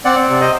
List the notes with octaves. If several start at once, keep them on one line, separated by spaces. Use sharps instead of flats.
C4 D5 F#5
C3
C5 D#5